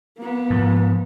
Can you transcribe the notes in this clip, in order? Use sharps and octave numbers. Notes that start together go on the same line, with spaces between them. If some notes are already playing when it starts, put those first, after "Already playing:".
A#3 B3
G#2 F3